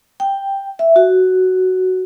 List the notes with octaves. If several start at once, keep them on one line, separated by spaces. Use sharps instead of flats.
G5
E5
F#4